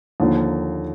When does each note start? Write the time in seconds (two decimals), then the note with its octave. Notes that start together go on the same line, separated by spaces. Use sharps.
0.20 D#2 D3 F3 A#3